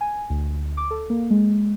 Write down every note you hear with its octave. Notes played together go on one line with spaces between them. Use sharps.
G#5
D2
D6
A4
A#3
G#3